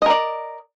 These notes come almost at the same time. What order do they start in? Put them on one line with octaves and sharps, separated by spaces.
D#5 A#4 D5